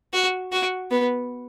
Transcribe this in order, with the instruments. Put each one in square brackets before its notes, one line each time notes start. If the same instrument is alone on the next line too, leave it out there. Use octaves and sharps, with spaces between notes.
[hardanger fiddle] F#4
F#4
B3